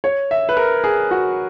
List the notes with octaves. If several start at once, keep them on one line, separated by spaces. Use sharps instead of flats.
C#5
E5
B4
A#4
G#4
F#4